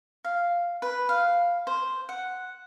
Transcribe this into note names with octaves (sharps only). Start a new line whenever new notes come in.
F5
B4
F5
C5
F#5